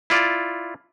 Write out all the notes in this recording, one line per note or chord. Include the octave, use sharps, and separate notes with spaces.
E4 F4 D5